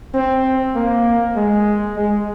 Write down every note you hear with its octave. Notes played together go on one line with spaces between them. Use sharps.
C4
A#3
G#3
G#3